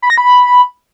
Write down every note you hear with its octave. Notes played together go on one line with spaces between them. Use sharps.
B5
A#6
B5